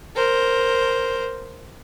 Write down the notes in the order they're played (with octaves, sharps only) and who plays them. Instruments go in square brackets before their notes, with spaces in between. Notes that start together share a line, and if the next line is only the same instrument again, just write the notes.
[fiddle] A#4 C5